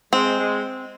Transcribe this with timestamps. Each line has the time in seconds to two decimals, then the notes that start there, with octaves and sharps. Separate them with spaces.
0.13 G#3 C4
0.39 G#3